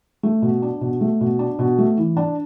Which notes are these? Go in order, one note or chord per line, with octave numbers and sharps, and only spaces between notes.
A3
B2
D4
B2
A3
B2
D4
B2
A3
E3
D4